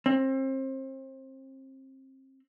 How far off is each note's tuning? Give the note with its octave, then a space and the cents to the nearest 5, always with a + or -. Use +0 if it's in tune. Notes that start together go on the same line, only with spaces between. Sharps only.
C4 +30